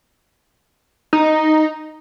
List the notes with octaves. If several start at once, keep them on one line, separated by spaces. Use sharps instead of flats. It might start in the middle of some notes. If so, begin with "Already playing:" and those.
D#4